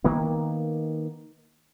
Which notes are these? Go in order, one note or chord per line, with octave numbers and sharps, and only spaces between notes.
D#3 A#3 B3